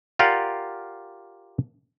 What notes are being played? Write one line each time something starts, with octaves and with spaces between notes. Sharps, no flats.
F4 G4 A#4 D5 F5 F#5